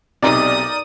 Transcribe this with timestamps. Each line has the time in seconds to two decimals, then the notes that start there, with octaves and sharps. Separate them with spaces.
0.22 B1 C3 D#4 A#4 D5 D#6